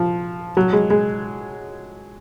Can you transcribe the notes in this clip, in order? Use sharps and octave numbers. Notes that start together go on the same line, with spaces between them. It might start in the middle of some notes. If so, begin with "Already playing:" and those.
Already playing: F3
F#3
G#3
G#3